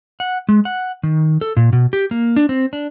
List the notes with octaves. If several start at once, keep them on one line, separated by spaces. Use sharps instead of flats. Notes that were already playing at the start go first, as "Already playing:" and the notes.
F#5
G#3
F#5
D#3
A4
A#2
B2
G4
A#3
D4
C4
D4